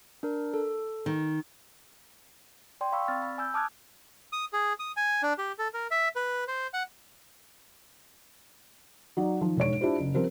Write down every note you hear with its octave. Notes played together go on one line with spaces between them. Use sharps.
D4 A#4
A4
D#3
D5 G5 C6
F5 B5 C#6 E6
C4 D5 B5 F6 A6
B5
G#5 E6 G6
A5 D6 D#6 F6 F#6 G#6
D#6
G#4
D#6
G#5
D4
G4
A4
A#4
E5
B4
C5
F#5
F#3 D#4 D5
D#3 F3
E1 G#2 C#5 D7
D4 E4 F4 G4 C5
F#1
F3 G3 C4 G4 A#4 C5